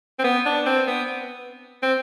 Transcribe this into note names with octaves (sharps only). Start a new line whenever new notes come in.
C4
B3
D4
C4
B3
C4